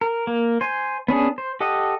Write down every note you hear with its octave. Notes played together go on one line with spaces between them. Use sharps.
A#4
A#3
C5 G#5
B3 C#4 D4 G#4
C5
G4 A4 D#5 F#5